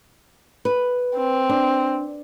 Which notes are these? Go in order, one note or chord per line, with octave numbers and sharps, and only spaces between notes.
B4
C4
D4